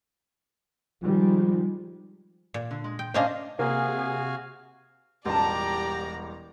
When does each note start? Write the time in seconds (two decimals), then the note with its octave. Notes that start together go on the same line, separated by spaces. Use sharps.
1.03 D#3 F3 G3 G#3
2.54 A#2
2.71 D3
2.84 G#3
2.99 G5
3.14 A#3 C#4 D4 C5 D#5 F5
3.59 C3 A#3 F#4 G#4 F5 G#5
5.25 E1 A1 G3 F4 G4 D5 A5 A#5